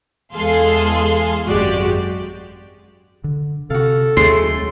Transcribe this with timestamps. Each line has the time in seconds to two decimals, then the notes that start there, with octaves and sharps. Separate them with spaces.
0.34 E2 G#3 G#4 A4 F5 C6
1.46 G#1 F#2 G#3 F#4 G4 D5
3.24 D3
3.70 C3 F#4 A4 F5
4.17 D#2 F#3 G#3 A3 C#4 C6